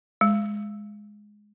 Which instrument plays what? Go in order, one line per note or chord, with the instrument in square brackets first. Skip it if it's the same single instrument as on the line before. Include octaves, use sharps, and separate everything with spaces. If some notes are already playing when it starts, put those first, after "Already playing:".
[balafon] G#3